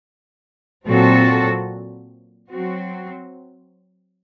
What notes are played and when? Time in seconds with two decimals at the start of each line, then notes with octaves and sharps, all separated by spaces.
0.87 A#2 F#3 C4 F#4 A4
2.50 F#3 C4 F#4